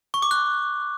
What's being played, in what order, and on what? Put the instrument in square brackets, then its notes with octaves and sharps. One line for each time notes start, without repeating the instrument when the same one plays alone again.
[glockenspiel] C#6
D6
F#6